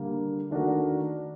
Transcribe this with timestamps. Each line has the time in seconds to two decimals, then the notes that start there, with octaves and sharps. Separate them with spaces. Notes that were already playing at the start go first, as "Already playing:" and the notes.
Already playing: D3 G3 A#3
0.51 D#3 A3 D4 F#4 A#4